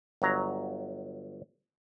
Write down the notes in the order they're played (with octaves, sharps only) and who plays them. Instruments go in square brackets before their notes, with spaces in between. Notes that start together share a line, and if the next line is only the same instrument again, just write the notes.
[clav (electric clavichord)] G1 F#3 A#5